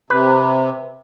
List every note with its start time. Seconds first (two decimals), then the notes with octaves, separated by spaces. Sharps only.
0.10 C3 B4